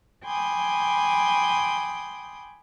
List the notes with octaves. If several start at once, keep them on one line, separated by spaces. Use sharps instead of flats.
G5 G#5 B5 C6 D6 D#6